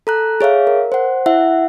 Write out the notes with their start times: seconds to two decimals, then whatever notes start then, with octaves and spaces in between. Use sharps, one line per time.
0.07 A4 A#5 F#6
0.41 G#4 C#5 E5 F5
0.67 A#4
0.92 C5 F#5
1.26 E4 E5 F#5